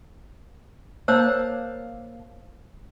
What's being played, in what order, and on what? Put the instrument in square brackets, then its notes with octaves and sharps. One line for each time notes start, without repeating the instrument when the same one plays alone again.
[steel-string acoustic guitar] A#3 F5 A5 [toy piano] C5 C#5 E6